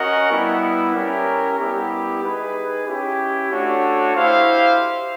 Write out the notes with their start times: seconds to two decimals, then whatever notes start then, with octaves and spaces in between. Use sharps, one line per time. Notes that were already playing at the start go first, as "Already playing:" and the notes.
Already playing: C#4 F#4 A#4 D#5 F#5
0.30 G3 B3 E4
0.94 C#4 E4 G4 A#4
1.58 G3 B3 E4 G4
2.23 D#4 G#4 B4
2.86 C#4 E4 G4
3.51 A3 D4 F#4 A4 C#5
4.16 E4 G4 C5 F5